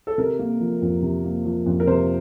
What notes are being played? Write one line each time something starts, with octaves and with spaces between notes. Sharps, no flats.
A4
C3 A#4
A#3
F3
F2
C3
A#3
F3
F2
A#4
C3 C5